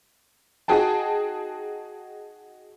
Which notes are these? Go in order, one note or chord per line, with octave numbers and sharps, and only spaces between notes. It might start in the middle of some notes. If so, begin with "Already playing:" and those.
D#4 F#4 G#4 G5 A5